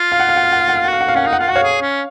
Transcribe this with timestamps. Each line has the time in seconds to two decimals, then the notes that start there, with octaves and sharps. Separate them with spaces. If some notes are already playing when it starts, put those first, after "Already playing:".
Already playing: F4
0.12 F5
0.20 F#5
0.29 F5
0.36 F#5
0.44 F5
0.52 F#5
0.60 F5
0.69 F#5
0.76 F5
0.84 F#5
0.88 F#4 F5
1.01 F#5
1.08 F5
1.15 C#4 F#5
1.24 D#4 F5
1.33 F#5
1.40 F4 F5
1.48 F#5
1.51 F#4 C#5 F5
1.64 G#4
1.82 C#4